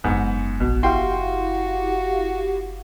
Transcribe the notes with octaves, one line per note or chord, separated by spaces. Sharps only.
F#1 G#2 B3 C4
A#1 B2
E4 F#4 G4 F5 G5 C6